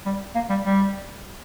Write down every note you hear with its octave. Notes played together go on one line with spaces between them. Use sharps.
G3
A#3
G3
G3